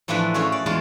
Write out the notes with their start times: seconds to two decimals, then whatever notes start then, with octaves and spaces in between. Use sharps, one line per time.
0.08 A2 E3 F3 A3 D4 B4
0.34 A3 C#4 F#4 G#4
0.52 D5
0.66 E2 G#3 F4 A5